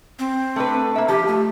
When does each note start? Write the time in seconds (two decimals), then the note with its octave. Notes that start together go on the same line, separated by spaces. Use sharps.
0.19 C4
0.56 A3 D4 B4
0.96 A#3 E5
1.09 F3 G4
1.27 A3